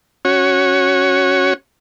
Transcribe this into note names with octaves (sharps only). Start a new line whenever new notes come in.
C#4 F#4 C#5